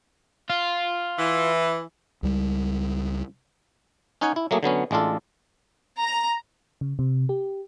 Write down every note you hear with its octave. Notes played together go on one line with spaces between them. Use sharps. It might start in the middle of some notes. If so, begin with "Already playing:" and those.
F4
E3
C#2 G3
C#4 D#4 C#5 F#5 G#5
E4
F#3 A3 A#3 G#4
D3 F#3 B3 C#4
A1 G#3 D4 F4 A4
A#5
C#3
C3
G4